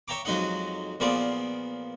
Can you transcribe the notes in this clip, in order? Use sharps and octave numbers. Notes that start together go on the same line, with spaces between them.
C#5 E5 G5 A#5 D6
F2 F#3 G#3 D#4 D#5 F#5
A#2 F3 B3 F4 G#4 D5